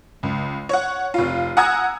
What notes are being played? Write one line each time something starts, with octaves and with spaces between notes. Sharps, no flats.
C#2
C#5 F#5
F1 F4
F#5 G#5 A#5 D#6 E6 G#6